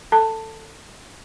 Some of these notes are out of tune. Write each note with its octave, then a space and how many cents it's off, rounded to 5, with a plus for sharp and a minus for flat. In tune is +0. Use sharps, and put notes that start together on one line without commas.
A4 +10 A5 +15